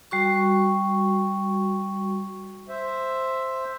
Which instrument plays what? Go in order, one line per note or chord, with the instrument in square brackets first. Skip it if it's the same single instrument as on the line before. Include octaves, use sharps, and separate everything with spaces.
[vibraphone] G3 F#4 C#6
[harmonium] C5 E5